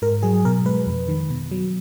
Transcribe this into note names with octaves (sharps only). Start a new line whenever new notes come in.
G#2 A#4
F#3 G#4
B2 A#4
G#3 B4
F2
D#3
B2
F#3